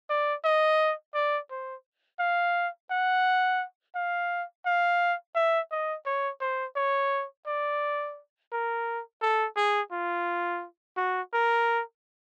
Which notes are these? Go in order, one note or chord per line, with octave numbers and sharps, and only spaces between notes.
D5
D#5
D5
C5
F5
F#5
F5
F5
E5
D#5
C#5
C5
C#5
D5
A#4
A4
G#4
F4
F#4
A#4